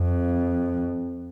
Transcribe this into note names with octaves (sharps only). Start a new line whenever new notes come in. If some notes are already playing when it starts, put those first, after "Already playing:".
Already playing: F2